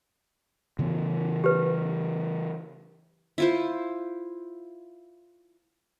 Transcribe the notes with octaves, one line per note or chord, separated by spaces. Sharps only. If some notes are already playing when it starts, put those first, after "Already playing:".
C#3 E3 B3
G4 B4
E4 F4 C5